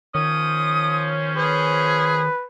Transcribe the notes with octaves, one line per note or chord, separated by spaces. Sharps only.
D#3 F3 C#4 C5 D#6
G#4 B4